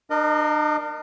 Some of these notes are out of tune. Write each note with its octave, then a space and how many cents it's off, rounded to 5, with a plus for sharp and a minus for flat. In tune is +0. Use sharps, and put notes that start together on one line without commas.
D4 +35 A#4 +0 D#5 -25